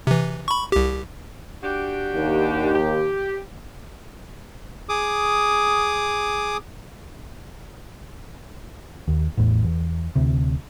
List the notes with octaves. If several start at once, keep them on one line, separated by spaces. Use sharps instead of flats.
C3 E3
B5 C#6
C2 G4
D4 F#4 G4
D#2
G4
G#4 D6 D#6
D#2
A1 E2 A2
E2
D2 C3